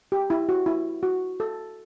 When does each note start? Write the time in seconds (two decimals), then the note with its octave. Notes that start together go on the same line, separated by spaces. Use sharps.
0.12 G4
0.30 E4
0.49 F#4
0.66 E4
1.03 F#4
1.40 A4